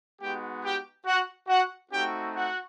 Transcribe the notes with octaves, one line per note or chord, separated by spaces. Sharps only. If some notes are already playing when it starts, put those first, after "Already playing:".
G#3 B3 D#4 F#4 G4 G5
G4 G5
F#4 F#5
F#4 F#5
A3 C4 D#4 F#4 G4 G5
F#4 F#5